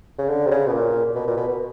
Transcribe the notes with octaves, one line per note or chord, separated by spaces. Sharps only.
C#3
D3
C3
C#3
B2
A#2
B2
A#2
B2
B2